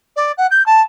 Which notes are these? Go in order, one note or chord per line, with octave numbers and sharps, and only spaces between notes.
D5
F#5
G6
A5